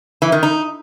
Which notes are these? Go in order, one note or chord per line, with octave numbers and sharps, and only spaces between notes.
E3
D#3
D#4